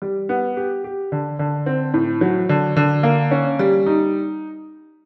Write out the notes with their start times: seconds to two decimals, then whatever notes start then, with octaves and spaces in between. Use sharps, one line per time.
0.02 G3
0.29 B3
0.57 G4
0.84 G4
1.12 D3
1.39 D3
1.66 C4
1.94 A2
2.21 F#3
2.49 D3
2.76 D3
3.03 A#3
3.31 C#4
3.59 G3
3.87 D#4